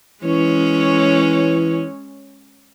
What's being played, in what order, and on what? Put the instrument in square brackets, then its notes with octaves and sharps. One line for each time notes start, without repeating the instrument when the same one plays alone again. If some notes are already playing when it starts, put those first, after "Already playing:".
[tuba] E3 [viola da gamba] G#3 C#4 C#5